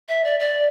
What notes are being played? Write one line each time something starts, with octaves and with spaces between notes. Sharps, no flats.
E5
D5
D5